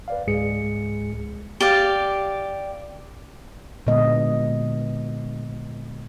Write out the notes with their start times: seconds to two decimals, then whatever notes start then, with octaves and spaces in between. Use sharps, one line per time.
0.08 B4 D5 F5
0.27 C#2 G#2 G#3 G#4 C#7
1.61 G4 D5 F5
3.87 A#2 D3 G#3 B3 D#5